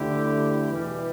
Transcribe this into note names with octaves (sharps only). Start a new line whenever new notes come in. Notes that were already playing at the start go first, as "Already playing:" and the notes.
Already playing: D2 D3 A3 E4 G4
E2 B2 E3 G3